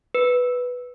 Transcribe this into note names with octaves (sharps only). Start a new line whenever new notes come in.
B4